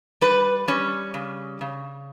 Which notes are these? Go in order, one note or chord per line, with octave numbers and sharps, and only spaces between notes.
G3 B4
G3 C#4
C#3
C#3